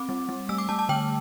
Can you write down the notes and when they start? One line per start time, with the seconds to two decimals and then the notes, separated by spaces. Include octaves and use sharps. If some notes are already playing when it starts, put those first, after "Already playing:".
Already playing: C4 D6
0.09 G3
0.29 G3
0.49 A3 E6
0.58 D6
0.69 A3 A5
0.79 A5
0.89 D3 G5